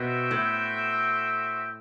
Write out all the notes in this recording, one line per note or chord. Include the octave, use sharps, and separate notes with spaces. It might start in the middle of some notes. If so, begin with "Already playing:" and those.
Already playing: B2 F#4 C5 E5 G5
A2